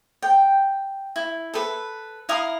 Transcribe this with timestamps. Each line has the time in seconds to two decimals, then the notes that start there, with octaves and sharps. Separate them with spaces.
0.22 G5
1.16 E4
1.54 A4 B4
2.29 E4 F5 A#5 D#6